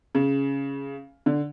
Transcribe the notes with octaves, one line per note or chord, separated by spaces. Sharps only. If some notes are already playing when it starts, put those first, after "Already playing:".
C#3
D3